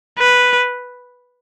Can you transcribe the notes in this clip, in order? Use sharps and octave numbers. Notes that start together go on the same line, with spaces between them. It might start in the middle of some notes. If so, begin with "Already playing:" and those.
B4